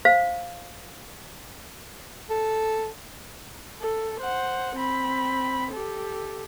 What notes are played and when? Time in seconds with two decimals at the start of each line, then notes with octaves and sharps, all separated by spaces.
0.05 C5 F5
2.30 A4
3.81 A4
4.20 C5 F#5
4.75 C4 B5
5.71 G4 A4